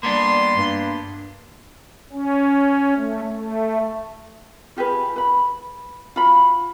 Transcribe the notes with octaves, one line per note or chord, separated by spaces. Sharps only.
G3 A#3 B3 D4 C6
G2
C#4
A3
A3
F4 G4 G#4 B4
B4 B5
F4 F#4 B5